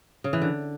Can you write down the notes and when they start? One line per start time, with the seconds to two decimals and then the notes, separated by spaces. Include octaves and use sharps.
0.24 C#3
0.33 E3
0.42 D3